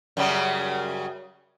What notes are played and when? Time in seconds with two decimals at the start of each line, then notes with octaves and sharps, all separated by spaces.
0.17 F#2 C#3 G3